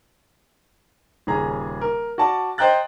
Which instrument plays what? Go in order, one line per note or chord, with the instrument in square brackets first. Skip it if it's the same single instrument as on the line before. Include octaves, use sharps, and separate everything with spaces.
[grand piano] D#1 C#3 G#4 A#5
A#4
F#4 D5 A5
C5 D#5 G5 A#5 F#6 A6